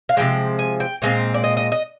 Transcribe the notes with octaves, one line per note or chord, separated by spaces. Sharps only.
F5
C3 F3 G#3 G5
G#5
G5
A#2 G#3 C4 F5
D5
D#5
D#5
D#5